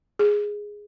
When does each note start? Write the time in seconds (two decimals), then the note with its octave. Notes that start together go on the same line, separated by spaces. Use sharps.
0.19 G#4